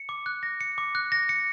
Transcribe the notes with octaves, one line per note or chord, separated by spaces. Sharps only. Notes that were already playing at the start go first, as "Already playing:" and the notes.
Already playing: C#7
D6
F#6
A#6
C#7
D6
F#6
A#6
C#7